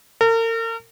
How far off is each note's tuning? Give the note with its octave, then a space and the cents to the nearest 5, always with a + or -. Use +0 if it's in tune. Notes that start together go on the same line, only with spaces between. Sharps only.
A#4 -40